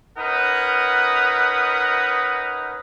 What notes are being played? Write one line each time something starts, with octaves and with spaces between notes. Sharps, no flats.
C#4 D#4 A#4 B4 F#5 D#6